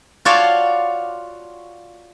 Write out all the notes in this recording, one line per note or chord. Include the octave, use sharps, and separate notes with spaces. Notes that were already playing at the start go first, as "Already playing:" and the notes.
F4 F#4 C#5 D5 F5 A5